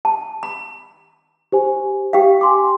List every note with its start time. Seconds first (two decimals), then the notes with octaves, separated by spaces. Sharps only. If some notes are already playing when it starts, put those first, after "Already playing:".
0.05 A5
0.43 B5
1.52 G4 C5 G#5
2.13 G4 F5 G5
2.41 G#5 C6 D6